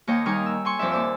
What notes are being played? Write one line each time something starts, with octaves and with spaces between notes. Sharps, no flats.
D#2 A#3 C#5 D#5 G5
D#3 G3 D#4 A#4 G#5 C#6
E6
G#5 C6 C#6
F2 F3 D5 E5
D#2 D5 E6